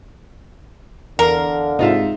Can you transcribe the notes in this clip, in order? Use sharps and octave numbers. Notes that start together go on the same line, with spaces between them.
E2 D3 D4 A#4 F5
G#2 C3 D#4 F4 E5